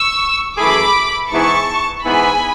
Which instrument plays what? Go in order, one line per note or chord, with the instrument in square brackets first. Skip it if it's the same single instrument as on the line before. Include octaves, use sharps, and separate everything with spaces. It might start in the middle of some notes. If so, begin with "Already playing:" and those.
Already playing: [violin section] C#6 E6
[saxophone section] F#2 E3 A3 E4 G#4 [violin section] B5 D6
[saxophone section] G#2 E3 B3 E4 G#4 [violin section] A5 C#6
[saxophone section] G#2 E3 B3 E4 G#4 [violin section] G#5 B5